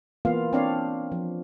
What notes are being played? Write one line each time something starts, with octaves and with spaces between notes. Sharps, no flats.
E3 A#3 B3 F4 F5
C4 D4 C#5 D5 F5
F3